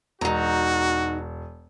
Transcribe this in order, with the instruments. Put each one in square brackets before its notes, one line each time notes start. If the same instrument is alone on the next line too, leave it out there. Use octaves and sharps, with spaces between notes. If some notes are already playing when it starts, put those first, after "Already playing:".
[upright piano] E1 [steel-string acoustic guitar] D#4 A#5 [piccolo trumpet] F#4